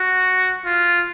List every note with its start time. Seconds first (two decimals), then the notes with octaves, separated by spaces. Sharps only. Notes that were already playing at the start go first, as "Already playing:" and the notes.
Already playing: F#4
0.65 F4